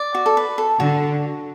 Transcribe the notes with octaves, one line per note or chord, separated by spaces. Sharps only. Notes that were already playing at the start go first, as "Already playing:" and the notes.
Already playing: D5
F#4
A4
B4
A4
D3 F#4